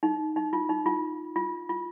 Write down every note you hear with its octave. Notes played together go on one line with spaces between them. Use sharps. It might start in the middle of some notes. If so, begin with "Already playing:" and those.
D#4
D#4
F4
D#4
F4
F4
F4